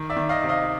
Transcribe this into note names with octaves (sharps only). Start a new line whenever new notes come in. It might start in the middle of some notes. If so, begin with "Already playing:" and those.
Already playing: D#3
D5 E5
D#3
D#5 F5
C3
D#5 F5